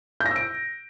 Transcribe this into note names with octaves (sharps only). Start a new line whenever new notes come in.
G6
A#6
E6
D7